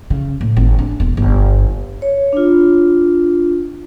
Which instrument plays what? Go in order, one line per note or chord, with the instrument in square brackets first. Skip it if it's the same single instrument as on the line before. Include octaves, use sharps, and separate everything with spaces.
[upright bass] C#3
A2
G#1
D4
E1
G1
[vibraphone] C#5
D4 F4